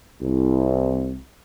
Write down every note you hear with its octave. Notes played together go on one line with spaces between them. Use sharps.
C2